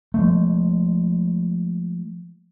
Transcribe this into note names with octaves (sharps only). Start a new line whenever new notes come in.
F3 G#3 A3